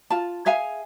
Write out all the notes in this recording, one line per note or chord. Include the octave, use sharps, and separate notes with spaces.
F4 A5
G#4 E5 F5 G#5